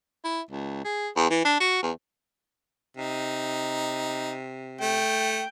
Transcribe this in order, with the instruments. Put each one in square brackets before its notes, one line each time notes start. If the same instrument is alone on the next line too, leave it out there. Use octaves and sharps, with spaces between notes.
[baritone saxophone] E4
C#2
G#4
E2
E3
D4
F#4
E2
[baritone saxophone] C3 [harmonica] D#4
[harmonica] A3 [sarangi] G5